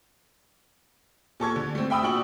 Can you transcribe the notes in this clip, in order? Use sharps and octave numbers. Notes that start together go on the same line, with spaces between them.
A#2 A4 C#6 G#6
D3
A3 C4
E5 G5 B5 D#6 E6
A#2 D4 F#4 G5 C#6 F#7